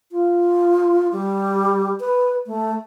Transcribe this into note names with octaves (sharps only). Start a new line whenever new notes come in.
F4
G3
B4
A3